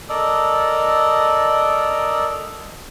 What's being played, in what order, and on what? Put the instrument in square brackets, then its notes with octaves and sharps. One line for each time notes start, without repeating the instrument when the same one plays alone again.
[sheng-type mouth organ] A4 A#4 D5 D#5